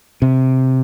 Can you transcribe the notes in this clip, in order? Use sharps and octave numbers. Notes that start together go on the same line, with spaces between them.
C3